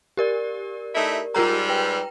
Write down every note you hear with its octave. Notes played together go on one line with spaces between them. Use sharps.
G4 A#4 D5
A3 D#4 E4
G#2 G3 F4 A#4 A#5
B4 G5